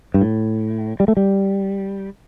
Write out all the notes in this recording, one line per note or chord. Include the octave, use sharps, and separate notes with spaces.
G2
A2
G3
A3
G3